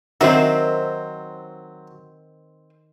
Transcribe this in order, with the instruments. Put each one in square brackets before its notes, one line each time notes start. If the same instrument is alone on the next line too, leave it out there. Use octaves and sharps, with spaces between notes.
[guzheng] D#3 [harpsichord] F#3 [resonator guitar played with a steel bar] C4 C5 E5